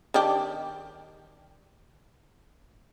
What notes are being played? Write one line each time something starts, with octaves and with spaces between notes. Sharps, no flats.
D#3 D4 G4